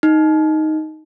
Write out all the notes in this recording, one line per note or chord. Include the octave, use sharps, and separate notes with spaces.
D#4